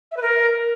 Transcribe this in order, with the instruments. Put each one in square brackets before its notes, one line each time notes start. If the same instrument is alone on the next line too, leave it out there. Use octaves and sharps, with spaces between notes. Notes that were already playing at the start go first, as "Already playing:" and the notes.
[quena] E5
B4
A#4